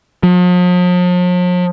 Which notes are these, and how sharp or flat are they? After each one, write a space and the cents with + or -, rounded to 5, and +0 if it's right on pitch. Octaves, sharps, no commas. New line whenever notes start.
F3 +45